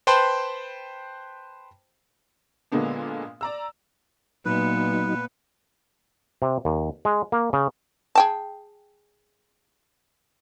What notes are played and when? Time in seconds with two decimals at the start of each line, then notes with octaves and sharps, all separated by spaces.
0.07 B4 C5 G5 A5 B5 C6
2.72 A#2 D3 G#3 A#3 B3 D4
3.41 D5 A#5 E6
4.46 A#2 F#3 B3 D#4 B4
6.42 C3
6.65 D#2
7.05 G#3
7.32 A#3
7.53 C#3
8.15 G#4 G5 A5